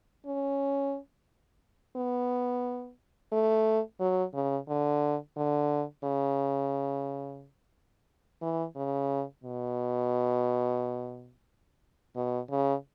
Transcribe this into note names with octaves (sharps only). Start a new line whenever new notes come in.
C#4
B3
A3
F#3
C#3
D3
D3
C#3
E3
C#3
B2
B2
C#3